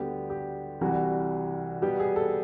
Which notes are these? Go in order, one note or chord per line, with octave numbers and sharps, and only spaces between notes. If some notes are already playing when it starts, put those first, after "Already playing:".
Already playing: D2 D3 G3 B3 G4
G4
C2 C3 E3 G3 F#4
B2 G3 B3 G4
G#4
A4